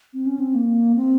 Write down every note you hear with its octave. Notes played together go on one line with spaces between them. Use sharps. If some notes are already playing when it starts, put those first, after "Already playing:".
C4
C#4
C4
A#3
C4